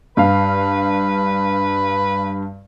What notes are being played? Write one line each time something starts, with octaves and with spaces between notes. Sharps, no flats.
G2 B4 F5